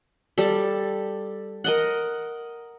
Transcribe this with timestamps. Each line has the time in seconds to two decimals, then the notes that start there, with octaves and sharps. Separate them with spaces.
0.38 G3 A4
1.64 A#4 D#5 F#5